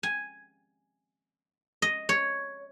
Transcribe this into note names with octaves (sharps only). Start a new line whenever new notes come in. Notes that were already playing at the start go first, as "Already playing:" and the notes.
G#5
D#5
C#5